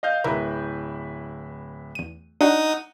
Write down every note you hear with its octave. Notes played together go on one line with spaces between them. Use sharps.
D#5 F5 G6
D1 E4 A#4 B4
E2 D#7
D4 D#4 F#4 F#5 D#6